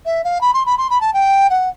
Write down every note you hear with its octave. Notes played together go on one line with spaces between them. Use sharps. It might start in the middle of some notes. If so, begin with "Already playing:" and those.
E5
F5
B5
C6
B5
C6
B5
A5
G5
F#5